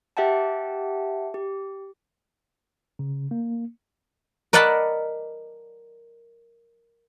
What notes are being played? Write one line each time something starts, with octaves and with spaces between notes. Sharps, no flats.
G4 E5 F#5 G5 A5
G4
C#3
A#3
A#4 D5 D#5 F#5 A5 B5